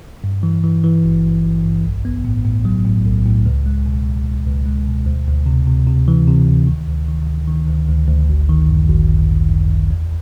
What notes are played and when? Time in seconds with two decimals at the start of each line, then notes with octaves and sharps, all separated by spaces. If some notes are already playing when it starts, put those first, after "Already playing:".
0.24 G2
0.43 E3
0.64 E3
0.84 E3
1.04 G#1
1.24 G#1
1.44 G#1
1.64 G2
1.84 B1
2.05 B3
2.25 A2
2.45 A2
2.65 F#3
2.84 A2
3.05 B1
3.26 A2
3.46 C#2
3.66 G#3
3.86 B2
4.06 C#2
4.27 C#2
4.46 C#2
4.66 G#3
4.87 B2
5.06 D2
5.27 D2
5.46 C3
5.67 C3
5.87 C3
6.08 E3
6.28 C3
6.48 D2
6.67 D#3
6.88 D2
7.08 D#3
7.28 D2
7.48 D#3
7.68 D2
7.88 D2
8.08 D2
8.29 G#1
8.49 D#3
8.69 F#2
8.89 G#1
9.09 F#2
9.30 F#2
9.49 F#2
9.70 F#2
9.91 E2